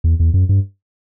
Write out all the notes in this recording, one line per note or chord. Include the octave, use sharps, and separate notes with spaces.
E2
E2
F#2
G2